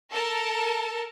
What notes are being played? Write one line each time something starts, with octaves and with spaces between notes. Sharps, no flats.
A4 A#4 A5